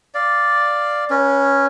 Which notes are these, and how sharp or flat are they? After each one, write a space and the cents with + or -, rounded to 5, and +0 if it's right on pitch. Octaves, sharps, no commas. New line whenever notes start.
D5 +0 F5 +0
C#4 +0 B4 -35